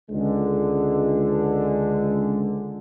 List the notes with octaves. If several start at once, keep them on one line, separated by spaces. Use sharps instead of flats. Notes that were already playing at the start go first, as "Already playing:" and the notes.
C#2 D3 G#3